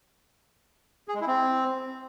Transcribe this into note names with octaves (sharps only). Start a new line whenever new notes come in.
G#4
G#3
E4
C4